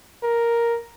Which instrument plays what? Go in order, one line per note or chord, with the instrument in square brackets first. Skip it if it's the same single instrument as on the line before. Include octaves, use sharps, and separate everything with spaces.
[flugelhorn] A#4